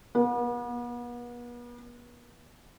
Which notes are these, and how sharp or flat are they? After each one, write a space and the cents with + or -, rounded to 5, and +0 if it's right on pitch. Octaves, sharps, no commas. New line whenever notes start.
B3 -40